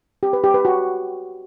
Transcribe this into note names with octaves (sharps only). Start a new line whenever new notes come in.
G4
B4
G4
B4
F#4